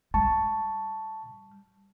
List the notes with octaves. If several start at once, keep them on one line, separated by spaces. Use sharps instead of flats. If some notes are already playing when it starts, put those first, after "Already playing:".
G3 A5 C#6